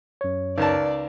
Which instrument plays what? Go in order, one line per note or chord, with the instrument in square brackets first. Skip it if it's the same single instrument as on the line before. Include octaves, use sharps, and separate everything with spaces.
[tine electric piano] F#2 C#5
[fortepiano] C#2 A#4 A5 [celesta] D#4 B4 [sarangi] D5